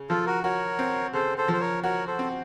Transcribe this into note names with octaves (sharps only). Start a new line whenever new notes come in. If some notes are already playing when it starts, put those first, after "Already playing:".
Already playing: C#3
F3 F4 A4
F#4 A#4
F#4 A#4 C#5
C4
C#3 A4 C5
A4 C5
F3 C5
A#4 C#5
F#4 A#4 C#5
A4 C5
C4